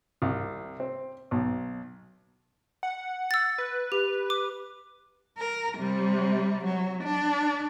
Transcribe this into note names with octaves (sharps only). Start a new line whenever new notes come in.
C2
C4
B1
F#5
E6 A6
B4
G4
D6
A#4
C3 G3
F#3
D4